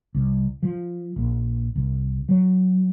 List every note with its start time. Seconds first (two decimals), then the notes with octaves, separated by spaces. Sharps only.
0.15 C2
0.63 F3
1.16 A#1
1.76 C2
2.29 F#3